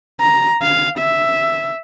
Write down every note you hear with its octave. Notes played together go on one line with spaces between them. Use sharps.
A#5
F5
E5